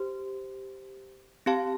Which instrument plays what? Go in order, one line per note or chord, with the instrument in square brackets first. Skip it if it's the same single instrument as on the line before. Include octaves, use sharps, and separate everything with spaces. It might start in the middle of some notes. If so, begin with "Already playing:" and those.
Already playing: [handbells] G4 C5
C4 G4 F5 A5